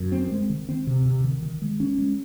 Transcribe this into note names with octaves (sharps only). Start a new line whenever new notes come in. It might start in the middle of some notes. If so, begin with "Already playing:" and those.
Already playing: F#2
C4
G#3
D#3
C4
C3
C3
D#3
D#3
G#3
C#4
G#3